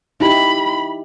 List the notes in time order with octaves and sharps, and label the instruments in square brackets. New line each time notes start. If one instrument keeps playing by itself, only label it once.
[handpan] D#4 E4 G4 [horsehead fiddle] B5